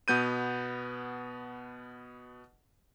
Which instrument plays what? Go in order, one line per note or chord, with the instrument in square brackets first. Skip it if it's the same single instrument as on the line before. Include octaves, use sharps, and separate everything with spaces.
[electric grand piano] B2 B3 G6 D#7